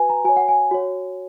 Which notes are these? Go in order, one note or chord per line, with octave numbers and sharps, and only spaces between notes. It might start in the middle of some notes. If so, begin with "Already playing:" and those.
Already playing: F#4 B4 G#5
A#5
F#4 C#5 G#5
F#5
G#5
F#4 C#5